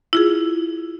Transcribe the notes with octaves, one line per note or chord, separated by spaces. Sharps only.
E4 F4 G#4